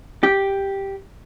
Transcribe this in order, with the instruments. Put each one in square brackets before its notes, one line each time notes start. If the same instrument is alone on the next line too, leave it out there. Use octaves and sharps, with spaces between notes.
[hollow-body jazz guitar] G4